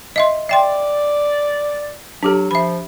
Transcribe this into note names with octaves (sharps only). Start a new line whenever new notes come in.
D#5 E5 C6
D5 E5 G5 C6
F#3 D4 G4 A4
F3 E5 B5